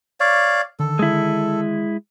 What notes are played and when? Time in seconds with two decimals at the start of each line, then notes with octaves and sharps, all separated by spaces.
0.20 C#5 D5 F5
0.79 D3 D#3 A4
0.99 G#3 E4